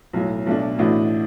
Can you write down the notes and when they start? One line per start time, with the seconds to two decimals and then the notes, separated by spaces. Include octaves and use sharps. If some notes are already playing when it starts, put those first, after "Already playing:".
0.13 B1 A2 F#3
0.46 B1 B2 A3 D4
0.79 A1 A2 E3 D4 F#4